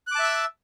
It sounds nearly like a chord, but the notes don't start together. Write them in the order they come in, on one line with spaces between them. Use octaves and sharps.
F#6 D6 A5 E5 E6